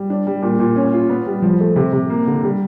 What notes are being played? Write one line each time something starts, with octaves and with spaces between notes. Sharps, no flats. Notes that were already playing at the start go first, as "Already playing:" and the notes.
Already playing: G3
D4
G3
A#2
A#2
C#4
F4
B3
G3
F3
A3
C3
C3
A#3
D3
G3